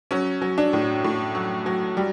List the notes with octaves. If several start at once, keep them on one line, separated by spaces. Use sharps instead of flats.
F#3 C#4
F#3
D4
A2
A2
F#3
F#3
G3